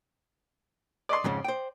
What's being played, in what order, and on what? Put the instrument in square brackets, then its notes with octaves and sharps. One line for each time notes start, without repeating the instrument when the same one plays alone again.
[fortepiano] D5 D#5 C6
[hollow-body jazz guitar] F2 G#2 C#3
C5 G5